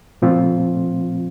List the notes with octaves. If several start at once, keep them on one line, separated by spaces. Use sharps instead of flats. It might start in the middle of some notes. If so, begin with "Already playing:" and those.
A#2 F3 A3 C4 F4